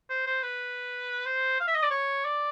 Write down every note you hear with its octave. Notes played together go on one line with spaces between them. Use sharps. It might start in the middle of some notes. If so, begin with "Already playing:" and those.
C5
C5
B4
C5
F5
E5
D#5
D5
C#5
D5